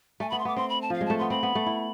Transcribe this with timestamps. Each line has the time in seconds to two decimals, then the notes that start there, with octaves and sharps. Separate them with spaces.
0.20 A3 G#5
0.30 B3 B5
0.39 C6
0.45 B3 D6
0.56 C4 C6
0.69 B5
0.82 A5
0.90 F3 F5
1.01 G#3
1.06 A3 A5
1.18 B3 C6
1.30 C4 B5
1.43 B3
1.55 A3
1.66 E4